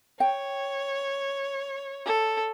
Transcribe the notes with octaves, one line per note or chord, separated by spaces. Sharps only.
C#5 G5
A4